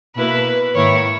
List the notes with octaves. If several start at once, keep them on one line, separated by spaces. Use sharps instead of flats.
B2 A#3 E4 B4
G#2 D#3 A#3 E4 C#5